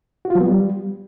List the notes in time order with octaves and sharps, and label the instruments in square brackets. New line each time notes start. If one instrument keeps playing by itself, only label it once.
[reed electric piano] F#4
F4
F#3
B3
G3